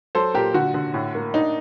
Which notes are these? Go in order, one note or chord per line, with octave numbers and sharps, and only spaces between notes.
F#3 A4 C5
A#2 G4 A#4
D3 F#4
D3
A2
A#3
D4 D#4